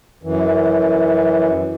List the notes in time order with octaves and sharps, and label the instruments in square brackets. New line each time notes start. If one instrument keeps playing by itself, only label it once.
[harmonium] F#2 E3